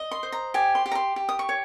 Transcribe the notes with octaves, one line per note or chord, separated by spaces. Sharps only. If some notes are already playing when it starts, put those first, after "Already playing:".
Already playing: D#5
C6
C5
A#5
G4 G#5
C6
G4
A#5
C6
G4
D#6
C#6
C#5